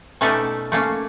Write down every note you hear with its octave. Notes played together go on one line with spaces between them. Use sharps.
B2 A3 C#4 D#4 D5 E5
A3 A#3 C#4